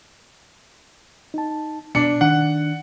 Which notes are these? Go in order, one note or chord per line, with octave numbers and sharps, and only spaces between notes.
D#4 A5
B2 D4 C#7
D#3 D4 F#5